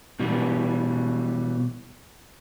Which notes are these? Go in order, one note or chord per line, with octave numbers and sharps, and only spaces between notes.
B2 E3 G3